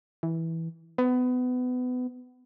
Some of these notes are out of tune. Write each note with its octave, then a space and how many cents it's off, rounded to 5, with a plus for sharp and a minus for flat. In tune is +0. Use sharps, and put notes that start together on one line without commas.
E3 -10
B3 +25